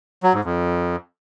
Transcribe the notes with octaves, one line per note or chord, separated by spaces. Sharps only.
F#3
G#2
F2